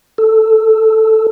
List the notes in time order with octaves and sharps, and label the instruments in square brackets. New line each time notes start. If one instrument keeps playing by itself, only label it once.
[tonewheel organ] A4